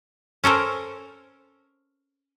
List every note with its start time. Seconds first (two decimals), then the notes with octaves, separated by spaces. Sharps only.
0.44 C#4 A4 A#4 C5